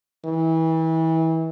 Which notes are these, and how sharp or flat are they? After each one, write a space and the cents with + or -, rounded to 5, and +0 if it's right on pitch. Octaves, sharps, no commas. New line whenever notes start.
E3 -30